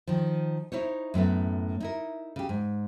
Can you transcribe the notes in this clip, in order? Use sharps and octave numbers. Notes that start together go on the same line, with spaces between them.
D#3 F3
D#4 E4 C5 C#5
F#2 A2 A3 B3
D#4 E4 A#4
C#3 G4
G#2